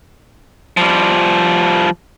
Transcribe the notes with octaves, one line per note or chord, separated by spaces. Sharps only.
F3 G3